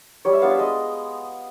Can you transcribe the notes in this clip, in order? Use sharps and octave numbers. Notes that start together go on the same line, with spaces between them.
G3 C#5
E5
B3 D4 F4 F5
E5
G#3 D#5